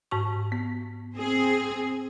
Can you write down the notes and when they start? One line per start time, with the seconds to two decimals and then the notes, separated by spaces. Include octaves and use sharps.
0.11 G#2 F#4 C#6
0.52 B3
1.15 C4 G#4